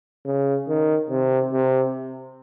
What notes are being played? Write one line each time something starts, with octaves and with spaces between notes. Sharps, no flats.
C#3
D#3
C3
C3